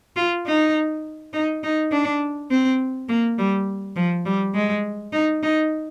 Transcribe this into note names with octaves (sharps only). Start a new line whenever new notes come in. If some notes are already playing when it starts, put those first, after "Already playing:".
F4
D#4
D#4
D#4
D4
C4
A#3
G3
F3
G3
G#3
D#4
D#4